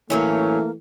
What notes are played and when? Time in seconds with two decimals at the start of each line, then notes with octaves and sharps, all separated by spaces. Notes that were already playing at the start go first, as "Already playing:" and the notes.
0.10 A2 E3 F#3 A3 A#3 C#4